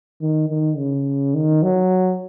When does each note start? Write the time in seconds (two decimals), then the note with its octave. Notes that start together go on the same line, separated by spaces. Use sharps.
0.21 D#3
0.49 D#3
0.77 C#3
1.34 D#3
1.63 F#3